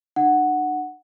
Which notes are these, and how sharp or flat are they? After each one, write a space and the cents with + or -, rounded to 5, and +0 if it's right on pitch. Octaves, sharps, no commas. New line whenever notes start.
D4 +45 F#5 +0